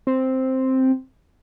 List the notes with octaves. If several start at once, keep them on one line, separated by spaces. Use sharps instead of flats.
C4